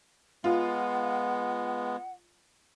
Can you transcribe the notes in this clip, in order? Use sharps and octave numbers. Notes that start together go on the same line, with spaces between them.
G#3 B3 F4 F#5